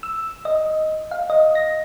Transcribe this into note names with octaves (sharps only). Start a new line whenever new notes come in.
E6
D#5
F5
D#5
A#6